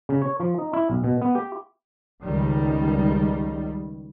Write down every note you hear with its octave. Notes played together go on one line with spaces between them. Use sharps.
C#3
C#5
F3
D#4
E4
B1
B2
B3
G4
C#2 D#3 G3